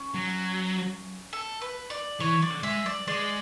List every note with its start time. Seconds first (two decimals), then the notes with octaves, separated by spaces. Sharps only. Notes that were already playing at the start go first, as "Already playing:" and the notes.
Already playing: C#4
0.15 F#3
1.33 A4
1.62 B4
1.90 D5
2.20 E3 C#5
2.42 D5
2.63 G#3 E5
2.86 D5
3.08 G#3 D5